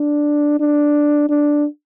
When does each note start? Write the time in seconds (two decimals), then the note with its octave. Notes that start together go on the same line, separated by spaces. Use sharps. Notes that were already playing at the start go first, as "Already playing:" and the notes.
Already playing: D4
0.60 D4
1.29 D4